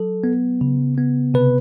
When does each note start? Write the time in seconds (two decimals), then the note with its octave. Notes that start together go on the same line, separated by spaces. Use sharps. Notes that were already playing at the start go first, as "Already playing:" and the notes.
Already playing: F#3 A4
0.24 B3
0.61 C#3
0.98 B3
1.34 C3 B4